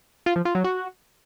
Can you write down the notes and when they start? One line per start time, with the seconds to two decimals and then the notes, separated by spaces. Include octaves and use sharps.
0.26 F4
0.36 F3
0.45 F4
0.55 F#3
0.64 F#4